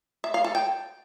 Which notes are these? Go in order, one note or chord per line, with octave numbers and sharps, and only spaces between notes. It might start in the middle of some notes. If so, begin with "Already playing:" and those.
E5
F5
A4
G5